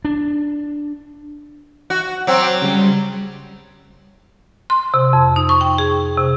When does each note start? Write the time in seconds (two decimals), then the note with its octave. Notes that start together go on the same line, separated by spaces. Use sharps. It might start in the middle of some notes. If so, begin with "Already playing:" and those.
0.05 D4
1.90 F#4
2.27 F#3 C4 D6
2.62 C#3 G3
4.70 C6
4.94 C3
5.13 F2
5.36 D#4
5.49 C#6
5.61 G5
5.78 G#4
6.18 C3